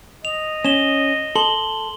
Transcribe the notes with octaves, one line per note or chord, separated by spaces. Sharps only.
D#5 F7
C#4 E7 G7
A4 C6 F#7 G7